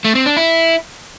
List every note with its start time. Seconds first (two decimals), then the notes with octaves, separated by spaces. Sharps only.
0.05 A3
0.15 C4
0.26 D4
0.37 E4